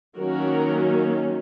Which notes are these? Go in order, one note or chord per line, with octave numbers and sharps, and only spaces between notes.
D#3 F#3 A#3 C#4 F#4 A#4